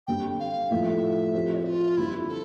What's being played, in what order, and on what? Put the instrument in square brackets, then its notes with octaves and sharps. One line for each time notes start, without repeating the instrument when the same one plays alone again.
[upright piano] D3 G3 C4 G4 [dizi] G5
[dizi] F5
[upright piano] A2 F3 A3 E4 [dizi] E5
[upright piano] F3 C4 G4
[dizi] F4
[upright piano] D3 G3 C4 [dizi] E4
[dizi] A4